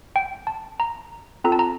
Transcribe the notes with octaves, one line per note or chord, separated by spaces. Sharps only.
G5
A5
A#5
C4 F4 A4 A#5
A5
A#5